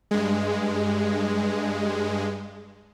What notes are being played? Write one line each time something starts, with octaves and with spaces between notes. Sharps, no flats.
G2 G#3